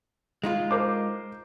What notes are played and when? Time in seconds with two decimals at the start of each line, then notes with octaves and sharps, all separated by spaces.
0.44 G#3 D#4 F4
0.71 A#4 C5 D6